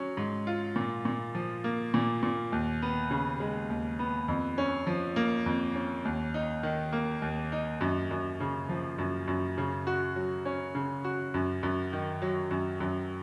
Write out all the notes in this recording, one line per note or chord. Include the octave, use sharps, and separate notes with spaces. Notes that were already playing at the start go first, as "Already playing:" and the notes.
Already playing: F#3 C#4
G#2
F4
A#2
A#2
F3
A#3
A#2
A#2
D#2
B3
C#3
G#3
D#2
B3
F2
C#4
F3
A#3
F2
C#4
D#2
D#4
D#3
A#3
D#2
D#4
F#2
F#2
C#3
F3
F#2
F#2
C#3
F#4
F#3
C#4
C#3
F#4
F#2
F#2
D#3
F#3
F#2
F#2